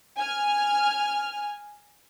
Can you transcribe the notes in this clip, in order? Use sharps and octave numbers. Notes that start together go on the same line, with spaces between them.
G#5 F6